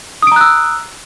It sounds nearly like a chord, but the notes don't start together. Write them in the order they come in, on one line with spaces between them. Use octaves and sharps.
D#6 D7 A#5 F#6 E6